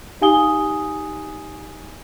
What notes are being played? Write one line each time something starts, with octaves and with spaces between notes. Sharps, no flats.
D#4 G4 F5 G#5 D#6 G7